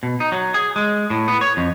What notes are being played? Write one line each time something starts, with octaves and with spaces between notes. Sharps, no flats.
B2
D#4
F#3
G#4
G#3
A2
B3
C#5
F2